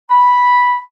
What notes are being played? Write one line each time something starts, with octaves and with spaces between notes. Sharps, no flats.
B5